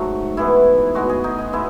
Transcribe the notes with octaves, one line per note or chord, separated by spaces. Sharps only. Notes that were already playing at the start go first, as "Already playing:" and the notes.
Already playing: G#2 F#3 A3 F#4
G#2 E3 B3 E4
A2 G#3 B3 F#4
G#4
D#4
D#4
G#3 B3 E4